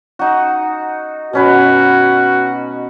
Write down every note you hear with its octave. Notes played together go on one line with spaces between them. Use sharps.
D#4 F#4
B2 C#4 F#4 B4